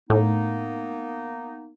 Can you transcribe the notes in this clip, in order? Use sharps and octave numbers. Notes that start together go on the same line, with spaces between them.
A2 A#3 B3 D#4